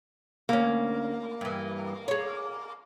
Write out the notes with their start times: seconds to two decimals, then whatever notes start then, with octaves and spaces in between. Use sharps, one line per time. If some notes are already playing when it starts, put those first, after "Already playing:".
0.49 D2 A#3 C#4
1.41 G2 E3
2.08 G#4 C#5